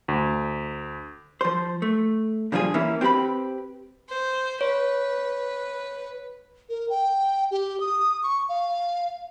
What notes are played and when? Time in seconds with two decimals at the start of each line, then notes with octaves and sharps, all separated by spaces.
0.08 D2
1.41 F3 C5
1.82 A3
2.52 A#2 D3 F3 G3 F4 G#4
2.74 E3 A#3 C#4 E4
3.01 C4 F4 G4 B4 B5
4.09 C5
4.61 B4 C#5
6.69 A#4
6.90 G5
7.51 G4
7.80 D#6
8.23 C#6
8.49 F5